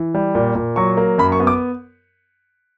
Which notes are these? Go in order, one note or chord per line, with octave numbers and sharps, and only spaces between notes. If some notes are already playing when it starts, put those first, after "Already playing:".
Already playing: E3
G3
A#2
A#2
F#3 C#6
A#3
F#2 B5
C#6
B3
D6